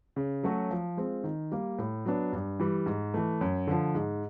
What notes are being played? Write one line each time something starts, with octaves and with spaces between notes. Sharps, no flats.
C#3
F#3 A3 C#4 F#4
F3
G#3 C4 F4
D#3
G3 A#3
A2
F#3 B3 D4
G2
E3 G3
G#2
E3 A3
F#2
D3 F3
G#2